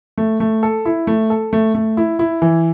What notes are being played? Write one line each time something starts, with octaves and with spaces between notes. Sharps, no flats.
A3
A3
A4
E4
A3
A4
A3
A3
E4
E4
E3